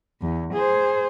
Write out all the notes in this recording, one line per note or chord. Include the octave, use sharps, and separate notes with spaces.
E2
G#4 C5